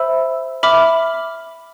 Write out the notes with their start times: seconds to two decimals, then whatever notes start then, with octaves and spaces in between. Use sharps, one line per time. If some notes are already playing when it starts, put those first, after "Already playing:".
Already playing: C5 E5 B5 E6
0.63 E5 B5 D6 F6